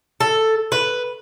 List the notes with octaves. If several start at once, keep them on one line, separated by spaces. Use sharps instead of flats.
A4
B4